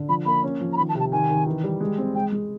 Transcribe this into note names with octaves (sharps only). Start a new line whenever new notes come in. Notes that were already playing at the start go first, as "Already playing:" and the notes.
Already playing: D3
F3 B5
A#3 B5
C#4
F3
A#5
D#3 B5
A5
C3
A5
D#3 G#5
D#3
E3
G3
G#3
C4
G#3 G5
G#3